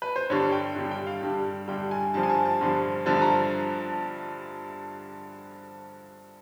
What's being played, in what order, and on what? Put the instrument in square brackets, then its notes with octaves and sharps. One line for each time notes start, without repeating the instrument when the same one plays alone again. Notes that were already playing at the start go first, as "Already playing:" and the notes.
[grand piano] B4
C5
G2 D3 G3 C#5
G5
G2 D3 G3
G5
F5
G2 D3 G3
G2 D3 G3 G5
G#5
G2 D3 F3 A5
G#5
A5
A5
G2 D3 F3
G2 D3 F3 A5
A#5